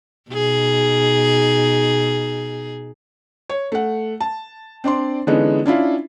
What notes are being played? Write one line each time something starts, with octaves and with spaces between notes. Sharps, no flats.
B2 D#4 G#4
C#5
A3 F#5
A5
C4 D4 D5 C6
D3 E3 G#3 B3 C#4 D#4
C#4 D4 E4 F4